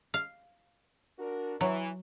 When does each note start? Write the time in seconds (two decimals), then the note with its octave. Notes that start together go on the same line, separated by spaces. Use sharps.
0.14 F5
1.19 D4 F#4 A#4
1.61 E3 F#3